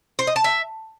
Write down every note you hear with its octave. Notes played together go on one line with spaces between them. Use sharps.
C5
D#5
A5
E5